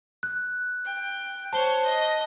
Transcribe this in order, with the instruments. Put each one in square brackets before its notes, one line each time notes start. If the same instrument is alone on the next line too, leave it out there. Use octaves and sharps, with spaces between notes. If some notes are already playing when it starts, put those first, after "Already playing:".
[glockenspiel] F#6
[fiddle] G5
[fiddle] C5 C#5 [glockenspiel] A5 G7
[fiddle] D#5